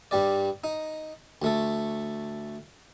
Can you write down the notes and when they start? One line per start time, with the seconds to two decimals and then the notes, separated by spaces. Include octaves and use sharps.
0.11 G2 G3 D5
0.64 D#4
1.42 D2 A3 A4